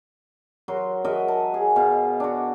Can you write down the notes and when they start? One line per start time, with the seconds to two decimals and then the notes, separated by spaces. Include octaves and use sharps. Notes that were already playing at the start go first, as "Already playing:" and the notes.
0.68 F#3 A#4 C6
1.04 F#4 A#4 D#5 E5
1.28 A5
1.54 G#4
1.76 B2 F5
2.20 D4 F#4